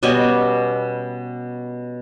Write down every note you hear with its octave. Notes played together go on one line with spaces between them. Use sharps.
B2 G3 C#4 D#5